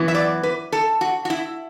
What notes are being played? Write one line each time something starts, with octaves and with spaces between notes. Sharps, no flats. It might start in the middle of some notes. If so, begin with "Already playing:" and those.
Already playing: F#2 E3 B3 E4
E5
D5
B4
A4
F#4
F#4
E4